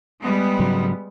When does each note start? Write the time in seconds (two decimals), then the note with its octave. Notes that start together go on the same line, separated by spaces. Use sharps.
0.22 G3 G#3 B3
0.59 G#2 C#3 F#3